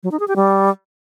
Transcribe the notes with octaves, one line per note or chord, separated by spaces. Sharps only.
F#3
D#4
G#4
G4
G3